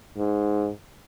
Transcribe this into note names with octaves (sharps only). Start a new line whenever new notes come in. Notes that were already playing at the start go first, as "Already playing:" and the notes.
G#2